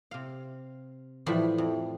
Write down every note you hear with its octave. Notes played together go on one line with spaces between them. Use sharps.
C3 F5
A2 E3 F3 G3 B5 C6
F2